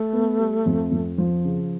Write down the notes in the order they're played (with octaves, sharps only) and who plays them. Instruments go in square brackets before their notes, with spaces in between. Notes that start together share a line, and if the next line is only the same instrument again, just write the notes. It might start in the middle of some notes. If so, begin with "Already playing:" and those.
Already playing: [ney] A3
[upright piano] B3
G3
F2
F2
F3
C#3